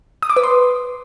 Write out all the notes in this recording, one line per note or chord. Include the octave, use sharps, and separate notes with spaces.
D#6
D6
B4
C6